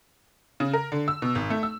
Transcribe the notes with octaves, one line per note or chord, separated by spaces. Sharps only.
C#3
A#4
D3
E6
B2
G#1
A3
E6